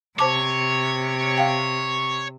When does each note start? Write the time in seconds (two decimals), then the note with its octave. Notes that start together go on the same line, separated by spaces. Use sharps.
0.19 C3 C5 C#5 A5 D6
1.38 F5 G5